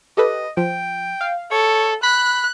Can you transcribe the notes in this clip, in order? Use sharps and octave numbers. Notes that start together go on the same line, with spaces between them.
G4 A4 B4 D#5
F3 G5
F5
A4 C#5
B5 F#6